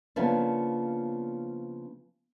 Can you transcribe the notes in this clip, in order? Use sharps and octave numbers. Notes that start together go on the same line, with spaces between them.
C#3 F3 A#3 B3 C#4 D4